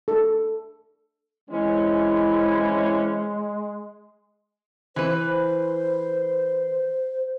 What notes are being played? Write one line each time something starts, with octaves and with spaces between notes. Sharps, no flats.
A4
E3 G#3 C4 C#4 E4
E3 B4 C5